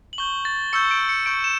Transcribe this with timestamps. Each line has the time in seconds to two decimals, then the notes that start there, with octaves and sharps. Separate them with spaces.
0.13 F#7
0.18 C#6 G6 G7
0.45 A6
0.73 C#6 E6 G6 C#7
0.91 D7
1.09 C#7
1.26 C#6 G6 D7
1.44 E7